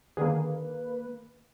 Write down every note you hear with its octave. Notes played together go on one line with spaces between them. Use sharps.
D3 D#3 A#3 G#4 B4